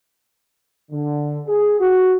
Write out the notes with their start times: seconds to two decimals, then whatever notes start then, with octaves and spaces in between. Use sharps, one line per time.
0.91 D3
1.47 G#4
1.80 F#4